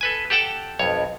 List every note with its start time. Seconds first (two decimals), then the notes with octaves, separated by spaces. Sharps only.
0.01 A4 B4 G#5
0.30 G4 A4 F#5 G5 A5
0.79 B1 F2 C#5